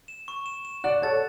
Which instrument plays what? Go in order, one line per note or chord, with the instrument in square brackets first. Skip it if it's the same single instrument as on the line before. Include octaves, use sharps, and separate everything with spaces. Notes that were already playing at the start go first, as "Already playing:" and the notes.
[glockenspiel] E7
C#6
E7
E7
[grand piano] D5 F#5 [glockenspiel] F#6
[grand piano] A4 C#5 [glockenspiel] A6